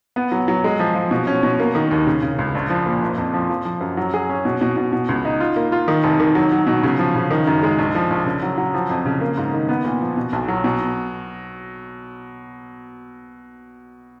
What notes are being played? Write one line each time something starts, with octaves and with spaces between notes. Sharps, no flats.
B3
F#3
F#3
G#3
F3
F3
B2
C#4
B2
A#3
D#3
D#2
C#3
C#3
C#2
A#1
F3
A#2
F#1
F2
F3
F3
F3
F#2
F#3
G#4
C#4
B2
B2
B2
B2
C#2
D#4
F4
A#3
F4
D#3
F1
D#3
F#3
F#3
B2
C#3
F3
C#3
D#3
F#2
G#3
A#1
F3
A#1
C#3
F#3
F#3
F3
F2
C#3
A#3
G#2
D#3
B3
A#2
F3
B2
B1
F#3
B2